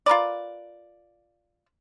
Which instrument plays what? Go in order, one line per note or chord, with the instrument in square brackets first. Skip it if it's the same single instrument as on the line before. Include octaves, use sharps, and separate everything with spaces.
[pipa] F4 A#4 B4 D5